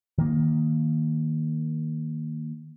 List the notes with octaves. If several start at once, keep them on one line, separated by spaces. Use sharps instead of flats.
D#3 A#3